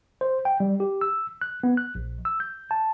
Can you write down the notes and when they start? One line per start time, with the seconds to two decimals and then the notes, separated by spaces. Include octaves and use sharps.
0.21 C5
0.45 G5
0.60 G3
0.80 G4
1.01 E6
1.41 F#6
1.64 B3
1.77 F#6
1.95 A#1
2.25 E6
2.40 G6
2.71 A5